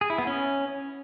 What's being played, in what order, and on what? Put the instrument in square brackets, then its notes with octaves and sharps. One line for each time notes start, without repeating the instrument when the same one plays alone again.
[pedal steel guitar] G#4
E4
B3
C#4